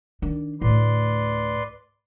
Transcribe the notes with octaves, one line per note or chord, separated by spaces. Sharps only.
D#3 D4
D2 A2 B4 D5 C6